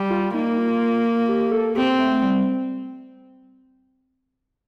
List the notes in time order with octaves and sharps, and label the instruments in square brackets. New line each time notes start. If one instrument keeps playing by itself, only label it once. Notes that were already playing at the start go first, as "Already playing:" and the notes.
Already playing: [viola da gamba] G3
[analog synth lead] F4
[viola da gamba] A#3 [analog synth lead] D#4
[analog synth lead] F4
G4
A4
[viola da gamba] C4 [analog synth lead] G4
[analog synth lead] A3
G3